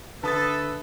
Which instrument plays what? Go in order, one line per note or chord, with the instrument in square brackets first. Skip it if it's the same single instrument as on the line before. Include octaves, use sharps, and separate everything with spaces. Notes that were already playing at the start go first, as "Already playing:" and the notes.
[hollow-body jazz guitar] D3 [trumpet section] A4 E5 [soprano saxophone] B4 [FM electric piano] A5 D#6 A6